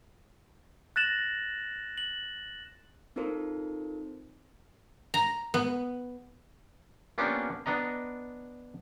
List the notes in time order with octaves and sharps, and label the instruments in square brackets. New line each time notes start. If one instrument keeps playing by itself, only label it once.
[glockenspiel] F#6 A6 A#6 E7 F#7
F#7
[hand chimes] C4 D#4 F4 A4 A#4 C5
[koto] A#5
B3
[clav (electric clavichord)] A#3 B3 C#4 D4 F4 G4
B3 D4 D#5 A#5